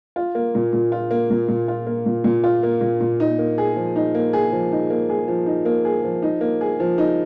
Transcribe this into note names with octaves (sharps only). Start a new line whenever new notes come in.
F4
A#3
A#2
A#2
F4
A#3
A#2
A#2
F4
A#3
A#2
A#2
F4
A#3
A#2
A#2
D#4
A#3
G#4
F3
D#4
A#3
G#4
F3
D#4
A#3
G#4
F3
D#4
A#3
G#4
F3
D#4
A#3
G#4
F3
D#4